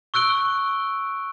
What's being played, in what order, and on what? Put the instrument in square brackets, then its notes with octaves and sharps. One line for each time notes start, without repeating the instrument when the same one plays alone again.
[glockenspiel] C#6 E6 F#6 D7 G7